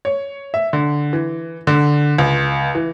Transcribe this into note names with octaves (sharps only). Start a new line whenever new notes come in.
C#5
E5
D3
E3
D3
C#2
E3